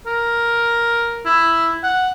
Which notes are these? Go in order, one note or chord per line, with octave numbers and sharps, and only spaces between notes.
A#4
E4
F#5